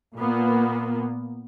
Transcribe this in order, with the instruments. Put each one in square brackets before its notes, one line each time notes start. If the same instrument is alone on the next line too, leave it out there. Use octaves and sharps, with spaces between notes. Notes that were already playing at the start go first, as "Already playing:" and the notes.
[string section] A#2 A#3 B3